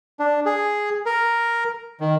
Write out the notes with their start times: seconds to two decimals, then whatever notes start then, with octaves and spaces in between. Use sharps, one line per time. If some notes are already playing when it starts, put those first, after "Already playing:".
0.19 D4
0.46 G#4
1.06 A#4
2.00 D#3